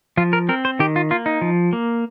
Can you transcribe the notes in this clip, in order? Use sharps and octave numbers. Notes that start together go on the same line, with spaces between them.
F3 F4
A#4
C4 A#4
C5
D#3 G4
F4
A#3 F4
D#4
F3
A#3